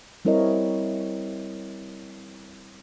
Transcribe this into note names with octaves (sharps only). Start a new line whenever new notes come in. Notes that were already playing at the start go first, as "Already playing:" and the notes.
G3 C4 E4 A#4 C#5 D#5